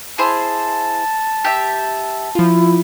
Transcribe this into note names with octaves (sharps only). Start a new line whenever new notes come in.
E4 G#4 C5 A5
G4 E5
F3 E4 F4